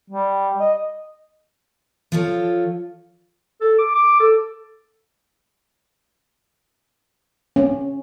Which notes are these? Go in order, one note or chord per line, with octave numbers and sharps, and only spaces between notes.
G3
D#5
F3 F4 A4 C#5
A4
D6
D6
A4
C#4